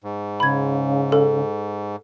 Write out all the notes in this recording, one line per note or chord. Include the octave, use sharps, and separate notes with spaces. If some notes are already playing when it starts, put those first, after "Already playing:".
G#2
C#3 B5 G#6
A4